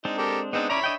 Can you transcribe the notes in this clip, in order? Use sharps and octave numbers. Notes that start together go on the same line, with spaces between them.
G#3 C4 D4 D#4
G4 A4 A#4
G#3 B3 C4 D4 D#4
C#4 C#5 D5 E5 A#5 B5
D4 D#5 G5